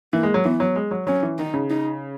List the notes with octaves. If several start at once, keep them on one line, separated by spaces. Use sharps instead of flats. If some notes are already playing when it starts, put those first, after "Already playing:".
E3 A#3
G#3
F#3
E3 B3
F#3
G#3
F#3
F#3 C#4
E3
D#3 D#4
C#3
D#4